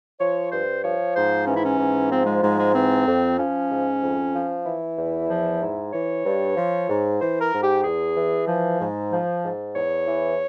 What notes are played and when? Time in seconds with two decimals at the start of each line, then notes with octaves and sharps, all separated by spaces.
0.19 F3 C#5
0.51 G2 C5
0.82 F3 C#5
1.15 G#2 C5
1.47 E3 C#4
1.56 E4
1.65 C#4
1.79 G#2
2.10 F3 C4
2.26 G#3
2.42 G#2 G#3
2.58 G#3
2.74 E3 C4
3.06 F2
3.38 F3 C#4
3.70 G#2
4.01 F2
4.33 F3
4.65 E3 E4
4.97 E2
5.29 F3
5.60 G#2
5.92 E3 C#5
6.25 G2
6.56 F3
6.88 G#2
7.19 E3 C5
7.41 A#4
7.52 G#2
7.62 G4
7.83 E2 G#4
8.16 E3
8.47 F3
8.79 G#2
9.11 F3
9.43 G#2
9.74 E2 C#5
10.06 E3